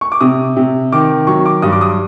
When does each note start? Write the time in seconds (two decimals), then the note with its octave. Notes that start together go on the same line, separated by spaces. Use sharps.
0.01 C#6
0.12 D6
0.20 C3 D#6
0.56 C3
0.92 D#3 D6
1.27 F#3 C#6
1.46 D6
1.62 G2 D#6
1.72 D6
1.81 D#6